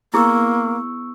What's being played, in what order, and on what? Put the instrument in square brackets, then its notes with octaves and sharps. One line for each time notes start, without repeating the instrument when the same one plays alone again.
[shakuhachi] A#3 [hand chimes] B3 C#6 E6 [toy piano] E4 G#4